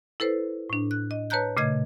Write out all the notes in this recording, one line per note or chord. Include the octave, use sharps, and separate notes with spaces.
E4 A4 B4 C5
A2 D4
F#6
D#5
B4 C#5 A5 A#5 F#6 G6
A#2 C#3 A3 D#5 G#6